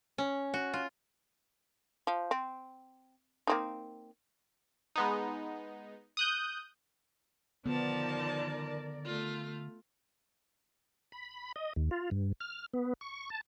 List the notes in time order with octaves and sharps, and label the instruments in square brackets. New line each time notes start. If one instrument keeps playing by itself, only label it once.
[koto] C#4
F#4
F4
[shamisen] F3
C4
A#3 C4 D#4
[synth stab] G#3 B3 D#4
D#6 F#6 G6
[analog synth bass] D3 [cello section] D#3 A#4 D5 [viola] F3 A5 [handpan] B3
[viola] A3 F4
[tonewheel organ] B5
D#5
D#2
F4
G2
F6
B3
C#6
A5